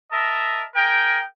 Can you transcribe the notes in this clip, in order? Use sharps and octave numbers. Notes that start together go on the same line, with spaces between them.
A#4 D#5 E5 A5
G#4 A#4 G5